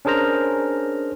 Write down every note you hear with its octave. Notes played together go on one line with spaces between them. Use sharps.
C#4 D4 G#4 A#4 C5 A#5